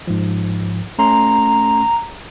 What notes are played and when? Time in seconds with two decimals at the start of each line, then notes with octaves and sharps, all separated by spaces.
0.07 G#2 F3
0.99 A3 C#4 A#5 C6